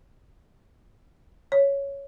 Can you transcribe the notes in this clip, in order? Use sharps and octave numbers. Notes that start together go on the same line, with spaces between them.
C#5